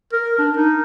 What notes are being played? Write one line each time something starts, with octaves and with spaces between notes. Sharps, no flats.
A#4
D4
D#4